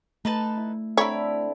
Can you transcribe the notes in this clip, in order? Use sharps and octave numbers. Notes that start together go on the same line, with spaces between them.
A3 D#4 B4 A5
E4
D3 C4 E4 A4 C#5 A#5 B5